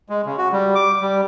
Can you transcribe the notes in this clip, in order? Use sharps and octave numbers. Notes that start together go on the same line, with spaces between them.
G#3
C#3
F#4
G3
D6
G3